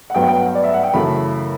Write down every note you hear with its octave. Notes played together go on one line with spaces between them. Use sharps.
F#5
G2 F#3 B3 G5
F#5
G5
F#5
D5
E5
F#5
G5
F#2 C#3 E3 A3 B5